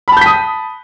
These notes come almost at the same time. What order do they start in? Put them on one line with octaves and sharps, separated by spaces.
B5 A5 G6 B6 D#6